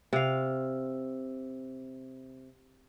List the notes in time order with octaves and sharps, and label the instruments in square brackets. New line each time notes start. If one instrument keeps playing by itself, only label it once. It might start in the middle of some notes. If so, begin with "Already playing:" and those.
[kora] C3 F5